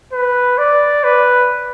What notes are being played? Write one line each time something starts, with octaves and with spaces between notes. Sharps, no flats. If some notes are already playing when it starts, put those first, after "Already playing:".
B4
D5
B4